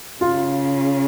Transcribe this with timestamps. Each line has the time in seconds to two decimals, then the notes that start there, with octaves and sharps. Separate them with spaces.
0.21 C#3 F4